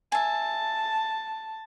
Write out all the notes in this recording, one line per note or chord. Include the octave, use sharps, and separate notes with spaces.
E5 G#5 A5